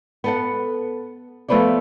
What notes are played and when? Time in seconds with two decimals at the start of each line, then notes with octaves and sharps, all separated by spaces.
0.24 B3 A4 F#5
1.48 F3 A3 B3 B4 C5 D5